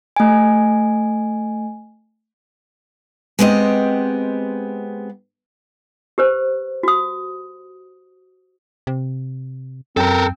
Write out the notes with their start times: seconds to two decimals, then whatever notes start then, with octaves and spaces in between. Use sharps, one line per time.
0.16 A3 G#5
3.39 G#3 B3 C4 G4 D#5
6.18 G4 B4 C5
6.83 F#4 D#6
8.87 C3
9.97 F#2 C4 A4 A#4